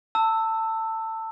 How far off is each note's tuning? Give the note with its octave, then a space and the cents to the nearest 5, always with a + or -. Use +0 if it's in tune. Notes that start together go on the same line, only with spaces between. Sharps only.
A5 +25 E6 -5